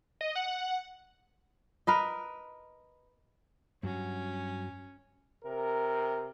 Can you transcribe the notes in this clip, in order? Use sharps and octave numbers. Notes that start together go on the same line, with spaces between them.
D#5
F#5
A#4 B4 D#5
G2 F#3 C#4 F#4
C3 A#4